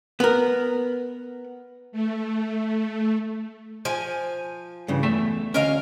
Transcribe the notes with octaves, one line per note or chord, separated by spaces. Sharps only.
B3 A#4
A3
F3 G#5
G2 C#3 E3
E2 A3 E5
D2 C#4 A#4 D#5 F5